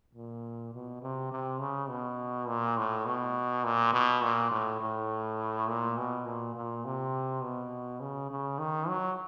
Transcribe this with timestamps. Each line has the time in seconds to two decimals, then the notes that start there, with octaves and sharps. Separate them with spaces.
0.15 A#2
0.74 B2
1.02 C3
1.31 C3
1.60 C#3
1.89 B2
2.48 A#2
2.77 A2
3.06 B2
3.64 A#2
3.93 B2
4.22 A#2
4.51 A2
4.81 A2
5.67 A#2
5.97 B2
6.26 A#2
6.55 A#2
6.85 C3
7.42 B2
8.00 C#3
8.30 C#3
8.59 D#3
8.88 F#3